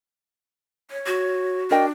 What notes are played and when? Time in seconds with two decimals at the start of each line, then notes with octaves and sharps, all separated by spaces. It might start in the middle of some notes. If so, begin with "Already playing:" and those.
0.91 C#5
1.06 F#4
1.71 D4 A#4 D#5 G5